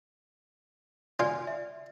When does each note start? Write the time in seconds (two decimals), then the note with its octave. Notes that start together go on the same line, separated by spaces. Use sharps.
1.20 F4 D5 F5 G#5
1.47 E5